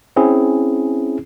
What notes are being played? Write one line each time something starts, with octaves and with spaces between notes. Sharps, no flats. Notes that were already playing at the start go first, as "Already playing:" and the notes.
C4 C#4 E4 G#4